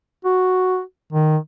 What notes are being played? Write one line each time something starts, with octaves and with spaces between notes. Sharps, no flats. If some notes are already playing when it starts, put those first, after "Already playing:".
F#4
D#3